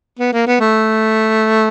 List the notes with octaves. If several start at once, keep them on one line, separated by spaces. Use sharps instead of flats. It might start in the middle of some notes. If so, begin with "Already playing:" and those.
B3
A#3
B3
A3